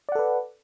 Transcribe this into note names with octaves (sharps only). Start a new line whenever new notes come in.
A4 B4 D5 F#5